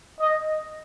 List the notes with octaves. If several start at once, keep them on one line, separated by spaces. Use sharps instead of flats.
D#5